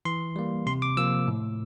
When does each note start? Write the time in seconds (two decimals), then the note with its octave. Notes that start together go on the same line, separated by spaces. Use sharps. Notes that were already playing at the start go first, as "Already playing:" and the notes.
0.05 E3 C6
0.36 G3 A#3
0.66 C3 C6
0.82 D6
0.97 F3 A#3 E6
1.27 A2